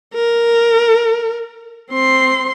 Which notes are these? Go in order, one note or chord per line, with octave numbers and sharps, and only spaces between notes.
A#4
C4 C6